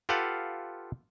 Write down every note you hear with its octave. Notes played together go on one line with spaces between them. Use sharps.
F4 G4 A4 B4 F5 F#5